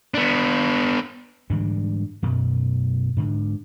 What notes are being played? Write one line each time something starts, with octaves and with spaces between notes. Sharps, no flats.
B3 D4
G#2 D3 E3 G3
F#2 B2
G#2 D3